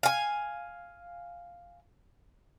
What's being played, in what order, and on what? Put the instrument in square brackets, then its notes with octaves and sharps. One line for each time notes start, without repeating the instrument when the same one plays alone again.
[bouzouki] F5 G#5